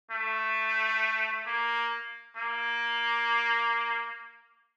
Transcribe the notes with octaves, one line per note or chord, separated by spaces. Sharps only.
A3
A#3
A#3